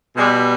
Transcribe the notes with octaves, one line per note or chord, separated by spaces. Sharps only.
B2 G3 G#3